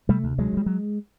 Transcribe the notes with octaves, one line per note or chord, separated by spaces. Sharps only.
C3 G3 A3
D2
D2 F#3 G#3
D2
G3
F#3